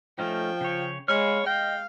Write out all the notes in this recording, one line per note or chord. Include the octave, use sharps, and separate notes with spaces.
F3 A3 C#4 D#4 G5
C#3 C#5
G#3 C#5 F5 B5 F6
D#5 F5 G5